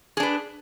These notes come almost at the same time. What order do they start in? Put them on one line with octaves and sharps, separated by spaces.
G#4 D4 B4